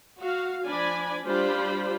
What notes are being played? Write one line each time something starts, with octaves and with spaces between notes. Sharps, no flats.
F#4 F5
F3 D4 D5 G#5 B5
G3 D4 F4 G4 C5 B5